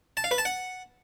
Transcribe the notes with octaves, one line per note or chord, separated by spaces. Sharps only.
A5
F5
B4
A5
F#5